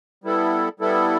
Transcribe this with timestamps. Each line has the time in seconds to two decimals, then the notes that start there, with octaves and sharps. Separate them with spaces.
0.24 G3 B3 E4 A4
0.80 G3 B3 E4 A4